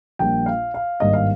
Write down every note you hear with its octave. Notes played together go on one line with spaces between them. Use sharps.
A#1 A#2 G3 A#3 G5
F5
F5
G#1 G2 G3 A#3 D#5
F5